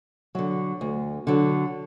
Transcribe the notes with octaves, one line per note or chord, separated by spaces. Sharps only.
D3 F#3
D2
D3 F#3